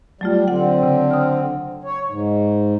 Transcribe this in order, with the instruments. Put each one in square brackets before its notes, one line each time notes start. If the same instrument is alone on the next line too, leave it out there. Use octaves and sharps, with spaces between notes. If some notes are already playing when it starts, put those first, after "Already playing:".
[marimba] F#3 A3 F4 [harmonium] G3
[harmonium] D3 C4 [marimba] F#5
[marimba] C#3
D#6 F6
[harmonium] C#5
G#2